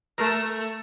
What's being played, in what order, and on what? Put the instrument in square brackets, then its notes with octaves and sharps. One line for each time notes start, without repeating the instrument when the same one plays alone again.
[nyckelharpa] A3 [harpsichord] A#4